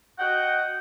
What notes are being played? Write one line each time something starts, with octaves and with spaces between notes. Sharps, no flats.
F#4 D#5 F#5 G5